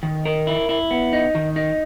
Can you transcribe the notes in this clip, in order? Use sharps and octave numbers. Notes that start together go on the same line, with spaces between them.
D#3
A#4
E4
E4
B3
D#4
D#3
D#4